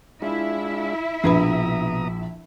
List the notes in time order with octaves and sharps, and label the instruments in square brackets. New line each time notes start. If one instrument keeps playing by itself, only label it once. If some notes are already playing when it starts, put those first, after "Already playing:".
[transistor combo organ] G#3 D4 F4 [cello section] E4 E5
[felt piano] A#1 [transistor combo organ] B2 A#5 D#6 [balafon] D4 B4 B5